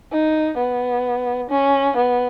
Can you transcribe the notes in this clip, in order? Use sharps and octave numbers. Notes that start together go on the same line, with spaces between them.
D#4
B3
C#4
B3